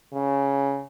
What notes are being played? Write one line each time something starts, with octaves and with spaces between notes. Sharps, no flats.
C#3